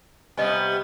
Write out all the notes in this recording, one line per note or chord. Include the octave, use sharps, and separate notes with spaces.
C3 G3 B3 D#5 G#5